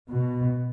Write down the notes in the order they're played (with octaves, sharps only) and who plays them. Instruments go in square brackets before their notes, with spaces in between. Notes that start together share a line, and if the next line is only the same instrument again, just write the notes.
[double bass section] B2